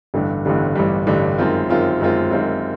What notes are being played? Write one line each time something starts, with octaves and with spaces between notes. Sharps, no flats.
A1 G2 D3 G3
A1 G2 D3 G3
A1 G2 D3 G3
A1 G2 D3 G3
F#2 D#3 G#3 C4 F4
F#2 D#3 G#3 C4 F4
F#2 D#3 G#3 C4 F4
F#2 D#3 G#3 C4 F4